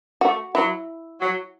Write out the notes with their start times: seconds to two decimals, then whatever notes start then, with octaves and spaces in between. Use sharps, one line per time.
0.21 A3 F#4
0.55 F#3 E4
1.21 F#3